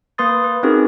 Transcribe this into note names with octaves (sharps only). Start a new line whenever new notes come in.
A#3 B4 C6 D#6 A6
B4
C4 C#4 D#4 F#4 G#4 A#4